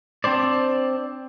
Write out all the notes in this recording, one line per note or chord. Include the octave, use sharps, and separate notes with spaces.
C4 D4 C5 D5